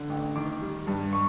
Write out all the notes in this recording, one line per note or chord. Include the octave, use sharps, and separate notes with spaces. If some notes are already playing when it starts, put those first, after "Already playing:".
Already playing: D3
A1
D#3 D6
G3
G2
C#6